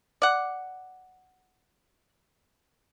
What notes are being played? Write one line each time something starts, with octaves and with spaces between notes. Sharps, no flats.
D5 F#5